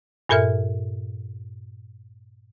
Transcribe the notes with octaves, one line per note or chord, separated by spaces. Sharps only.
G2 A#2 A4 A#4 E5 F6